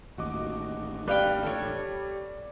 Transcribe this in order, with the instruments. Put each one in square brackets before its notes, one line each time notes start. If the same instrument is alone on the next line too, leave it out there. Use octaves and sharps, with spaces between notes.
[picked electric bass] A1 D#2 [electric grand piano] F#4 D#5 D6
[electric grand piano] G3 [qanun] B4 F5 G5 [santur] D5
[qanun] A4 C#5